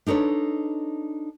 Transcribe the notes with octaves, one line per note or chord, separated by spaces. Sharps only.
D4 D#4 A4 B4 C#5